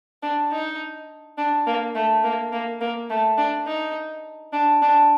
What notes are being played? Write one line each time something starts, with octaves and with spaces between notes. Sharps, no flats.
D4
D#4
D4
A#3
A3
A#3
A#3
A#3
A3
D4
D#4
D4
D4